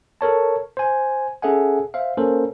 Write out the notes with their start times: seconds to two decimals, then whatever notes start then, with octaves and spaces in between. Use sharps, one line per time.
0.21 A4 A#4 C#5 A5
0.77 C5 G#5
1.42 C#4 G#4 A4 E5 F#5 G#5
1.94 C5 E5 F5
2.17 A#3 C#4 A4 A#4 C5